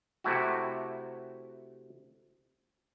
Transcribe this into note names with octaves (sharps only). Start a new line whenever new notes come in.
C3 A3 E4 F#4